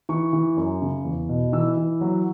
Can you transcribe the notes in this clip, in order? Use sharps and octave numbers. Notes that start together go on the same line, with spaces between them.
E3 C#6
E3
F#2
C#3
E2
B2
E3 E6
E3
F#3